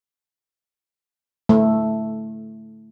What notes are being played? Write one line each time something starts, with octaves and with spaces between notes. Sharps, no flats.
A3